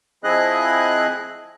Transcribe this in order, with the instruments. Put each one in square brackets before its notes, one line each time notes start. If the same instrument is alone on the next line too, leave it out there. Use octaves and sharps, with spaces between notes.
[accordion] F3 C4 E4 G#4 D#5 F#6